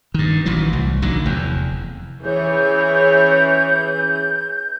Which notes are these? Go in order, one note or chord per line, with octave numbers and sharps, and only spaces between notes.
G2 D#3
A1 D#3 E3 F#3
C2
A1 D3 D#3 F#3
F1 E2
E3 C#4 G#4 C#5 G6